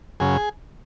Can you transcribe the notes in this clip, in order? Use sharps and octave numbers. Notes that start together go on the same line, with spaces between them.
F#2 C#3 G#4